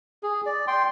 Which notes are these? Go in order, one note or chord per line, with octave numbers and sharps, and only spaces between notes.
G#4
D5
G5 C6